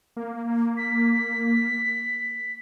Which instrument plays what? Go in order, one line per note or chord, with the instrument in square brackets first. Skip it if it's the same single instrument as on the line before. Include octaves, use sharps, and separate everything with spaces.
[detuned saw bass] A#3
[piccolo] B6